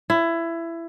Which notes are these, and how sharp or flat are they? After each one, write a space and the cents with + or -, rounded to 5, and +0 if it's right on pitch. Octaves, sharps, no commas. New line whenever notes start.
E4 +20